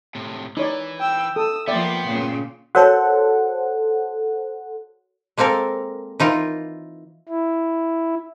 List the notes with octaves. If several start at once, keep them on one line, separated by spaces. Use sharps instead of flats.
A2 C3
E3 D#4 C#5 D5
G5 E6
A4 D#6 E6
F3 A#3 B3 D5 E5 G5 C6
A#2 C#3
F#4 A4 A#4 C5 C#5 F#5
G#3 A#3 C4 A4 A#4
E3 D#4 F4 A#4
E4